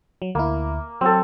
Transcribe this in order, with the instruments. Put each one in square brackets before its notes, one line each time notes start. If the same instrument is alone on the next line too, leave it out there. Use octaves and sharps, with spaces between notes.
[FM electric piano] F#3
[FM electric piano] D2 E4 [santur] A#3
[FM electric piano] F#3 [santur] C4 A4